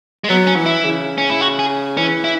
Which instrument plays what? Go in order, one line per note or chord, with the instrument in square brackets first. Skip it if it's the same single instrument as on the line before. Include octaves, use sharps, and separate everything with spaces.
[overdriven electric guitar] G#3
[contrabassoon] F#3 [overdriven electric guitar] B3
[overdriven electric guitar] C#4
[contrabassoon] E3
[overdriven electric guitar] E4
[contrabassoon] C#3
[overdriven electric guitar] C#4
E4
F#4
G#4
[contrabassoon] E3 [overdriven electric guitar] C#4
[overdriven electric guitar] E4